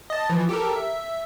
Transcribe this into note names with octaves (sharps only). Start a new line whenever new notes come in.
D#5 A5
E3 F3
G4 A4 A#4
E5